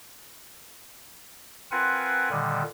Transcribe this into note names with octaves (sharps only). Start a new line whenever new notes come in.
C4 F4 A#4 B4 F#5 G#5
A#2 D3 D#3 G3